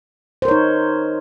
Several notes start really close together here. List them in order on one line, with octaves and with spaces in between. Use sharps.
C5 A#4 C#5 D#4